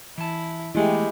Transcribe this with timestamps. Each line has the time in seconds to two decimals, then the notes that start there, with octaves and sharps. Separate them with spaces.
0.18 E3 E4 A5
0.75 E3 G#3 A3 B3 E4 G4